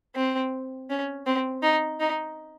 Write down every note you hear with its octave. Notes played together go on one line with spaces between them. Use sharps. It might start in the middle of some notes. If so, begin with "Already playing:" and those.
C4
C#4
C4
D#4
D#4